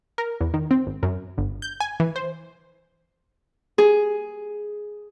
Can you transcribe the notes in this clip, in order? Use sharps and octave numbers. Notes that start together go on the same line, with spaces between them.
A#4
E2
D#3
C4
G#1
F#2
G1
G6
G#5
E3
C5
G#4